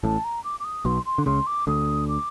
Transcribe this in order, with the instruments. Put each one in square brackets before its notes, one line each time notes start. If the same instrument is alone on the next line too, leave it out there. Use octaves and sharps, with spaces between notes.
[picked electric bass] A1 A2 [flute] A5
[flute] A#5
D6
D6
D#6
[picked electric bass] B1 B2 [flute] C6
[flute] C6
[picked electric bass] D3
[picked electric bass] C#2 C#3 [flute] C6
[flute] D6
[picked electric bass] D2 D3 [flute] D#6
[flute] D6